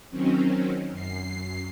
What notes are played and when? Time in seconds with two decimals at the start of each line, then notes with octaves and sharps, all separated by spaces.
0.10 D#3 F#3 C4 C#4
0.91 F#2 C7